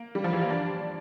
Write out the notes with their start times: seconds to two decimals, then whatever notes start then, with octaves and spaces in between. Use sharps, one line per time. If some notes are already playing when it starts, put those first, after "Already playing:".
Already playing: A#3
0.15 G3
0.24 F3
0.33 E3
0.42 A#3
0.50 D4